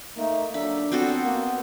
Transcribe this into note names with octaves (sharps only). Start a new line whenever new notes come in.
A3 A#3 D#4
F#3 D4 A4 B5
B3 C4 F#4 A4
A#3